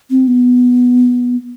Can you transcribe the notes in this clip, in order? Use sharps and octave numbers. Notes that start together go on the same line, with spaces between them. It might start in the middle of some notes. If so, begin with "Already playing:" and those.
C4
B3